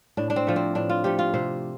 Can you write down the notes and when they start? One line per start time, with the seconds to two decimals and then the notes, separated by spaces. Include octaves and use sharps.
0.17 A2 D4
0.30 D4
0.36 C4
0.47 F3 A3
0.56 C4
0.75 A2 D4
0.89 F4
1.04 F3 A3 G4
1.19 F4
1.34 C3 C5